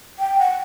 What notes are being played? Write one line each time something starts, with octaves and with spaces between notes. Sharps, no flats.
G5
F#5